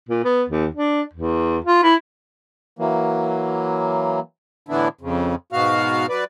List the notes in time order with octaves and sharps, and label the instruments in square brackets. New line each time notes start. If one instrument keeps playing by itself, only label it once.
[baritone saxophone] A#2
B3
D#2
D4
E2
F4
E4
[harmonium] E3 F#3 A#3
[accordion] A2 D3 E3 B3 D4 E4
F2 C#3
G#2 B2 B3 F#4 F5 F6
F#3 B4 D5